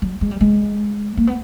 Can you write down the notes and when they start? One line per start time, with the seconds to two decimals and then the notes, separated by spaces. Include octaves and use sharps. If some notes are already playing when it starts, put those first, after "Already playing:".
0.02 F#3
0.21 G#3
0.31 G3
0.41 G#3
1.17 A#3
1.27 B3